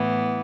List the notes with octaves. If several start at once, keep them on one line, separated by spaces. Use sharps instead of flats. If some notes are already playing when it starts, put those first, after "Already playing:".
Already playing: A2 E3 B3